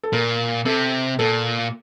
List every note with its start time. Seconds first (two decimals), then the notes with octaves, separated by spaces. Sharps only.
0.03 A4
0.13 A#2 A#4
0.65 C3 A4
1.19 A#2 A4